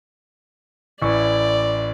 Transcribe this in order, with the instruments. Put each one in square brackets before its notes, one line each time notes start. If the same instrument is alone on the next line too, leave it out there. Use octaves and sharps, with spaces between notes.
[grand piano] A1 E4 C#6 [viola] D5